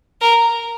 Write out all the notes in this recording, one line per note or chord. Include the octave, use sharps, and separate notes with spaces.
A#4